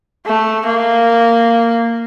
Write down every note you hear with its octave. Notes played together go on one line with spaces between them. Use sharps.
A3
A#3